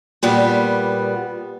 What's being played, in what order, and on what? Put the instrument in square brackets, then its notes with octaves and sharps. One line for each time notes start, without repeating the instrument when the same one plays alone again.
[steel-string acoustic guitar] A#2 G3 B3